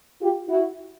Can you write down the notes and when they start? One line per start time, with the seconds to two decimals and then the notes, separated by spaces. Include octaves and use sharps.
0.21 F4 G4
0.49 E4 F#4